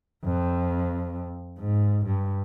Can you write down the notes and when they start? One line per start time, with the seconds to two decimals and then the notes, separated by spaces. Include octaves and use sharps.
0.24 F2
1.59 G#2
2.06 G2